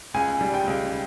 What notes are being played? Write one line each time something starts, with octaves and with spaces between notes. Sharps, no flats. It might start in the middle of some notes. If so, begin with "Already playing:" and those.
C#2 G#5
G3
G5
C#2